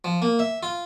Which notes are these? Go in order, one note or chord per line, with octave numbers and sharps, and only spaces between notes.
F3
A#3
E5
F4